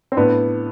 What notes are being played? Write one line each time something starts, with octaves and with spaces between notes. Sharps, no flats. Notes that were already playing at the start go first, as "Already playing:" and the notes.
C4
A2 B3 D4